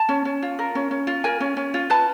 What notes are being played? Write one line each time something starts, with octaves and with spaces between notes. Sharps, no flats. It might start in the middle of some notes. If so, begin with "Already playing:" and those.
Already playing: A5
C#4
C#4
F4
A#4
C#4
C#4
F4
A#4 G#5
C#4
C#4
F4
B4 A5